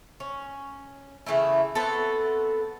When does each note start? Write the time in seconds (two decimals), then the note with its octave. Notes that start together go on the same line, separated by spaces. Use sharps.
0.20 C#4
1.26 C#3 E3 A3 E4
1.75 B3 C4 F#4 A4